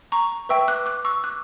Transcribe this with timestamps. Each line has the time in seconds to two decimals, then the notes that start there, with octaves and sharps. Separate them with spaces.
0.12 A#5 C#6
0.49 B4 E5 G5 C#6 E6
0.68 D6 F#6
0.86 D6 F#6
1.05 C#6 E6
1.24 D6 F#6